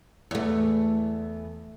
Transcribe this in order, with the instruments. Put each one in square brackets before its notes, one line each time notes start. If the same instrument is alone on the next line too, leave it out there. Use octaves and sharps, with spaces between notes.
[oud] E2 A3